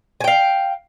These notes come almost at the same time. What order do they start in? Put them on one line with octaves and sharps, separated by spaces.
G#5 G5 F5